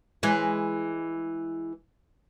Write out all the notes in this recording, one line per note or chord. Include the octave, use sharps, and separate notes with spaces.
E3 G#3